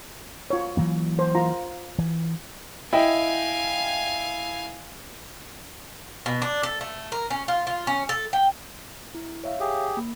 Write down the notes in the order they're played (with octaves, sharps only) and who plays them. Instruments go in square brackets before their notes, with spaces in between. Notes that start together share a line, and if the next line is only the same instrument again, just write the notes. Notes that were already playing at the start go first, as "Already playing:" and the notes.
[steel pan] F4 C#5
[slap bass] E3 F#3 A#3
[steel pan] C5
F4 A#5 C6
[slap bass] E3
[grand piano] E4 D#5 G5 [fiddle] F5 G#5
[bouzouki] B2
D4
A4
A3
A#4
C#4
F4
F4
C#4
A4
G5
[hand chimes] E4
C#5 E5 F5
[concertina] G4 G#4
[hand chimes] A#3